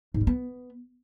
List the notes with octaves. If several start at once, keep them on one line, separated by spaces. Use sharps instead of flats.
G#2
G3
B3